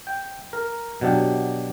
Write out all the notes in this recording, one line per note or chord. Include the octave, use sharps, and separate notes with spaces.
G5
A#4
B2 F#3 D4 G4